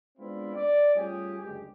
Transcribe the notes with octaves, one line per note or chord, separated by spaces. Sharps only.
G#3 B3 C4 D4 E4 F4
D5
G3 A3 C#4 F4 G4 G#4
F#1 D2 G2 G#3 G4